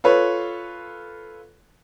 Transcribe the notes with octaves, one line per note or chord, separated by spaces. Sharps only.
F4 A4 B4 C#5